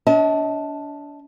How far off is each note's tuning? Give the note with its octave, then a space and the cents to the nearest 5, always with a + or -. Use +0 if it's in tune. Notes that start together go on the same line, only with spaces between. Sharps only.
D4 -35 D#5 +45 A5 +0